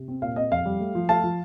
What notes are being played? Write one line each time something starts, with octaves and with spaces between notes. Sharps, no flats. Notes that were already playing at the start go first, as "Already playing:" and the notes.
Already playing: C3
C4
A#2 F5
C4 D#5
F2 F5
G3
A3
F3
A3 F5 A5
F3